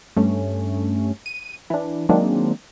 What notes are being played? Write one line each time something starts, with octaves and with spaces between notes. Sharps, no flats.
G2 A3 C#4
D#7
E3 D4
D#3 F#3 G#3 A#3 C4 D4